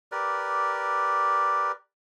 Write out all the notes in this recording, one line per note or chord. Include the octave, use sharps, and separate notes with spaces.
G4 A#4 B4 D5